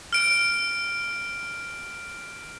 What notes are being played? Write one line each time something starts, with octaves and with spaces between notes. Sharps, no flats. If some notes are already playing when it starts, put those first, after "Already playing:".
F6 D7